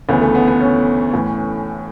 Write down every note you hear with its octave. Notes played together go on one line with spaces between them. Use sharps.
D2 C#3 E3 B3
A3
B3
B3
C#4
A1 A2 E3